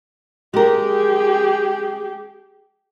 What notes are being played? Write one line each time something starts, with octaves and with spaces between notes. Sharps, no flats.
G#3 G4 G#4 A#4